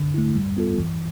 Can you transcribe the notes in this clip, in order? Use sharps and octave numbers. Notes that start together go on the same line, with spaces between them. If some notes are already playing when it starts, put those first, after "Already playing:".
Already playing: D3
A3 E4
G3
B3 F4 A4
E3